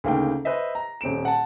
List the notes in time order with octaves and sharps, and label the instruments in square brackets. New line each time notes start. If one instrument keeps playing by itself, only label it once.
[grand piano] D2 C#3 A#3 D#4 G5
B4 C5 D#5 E5
A#5
D#1 C4 D7 E7
F#5 A5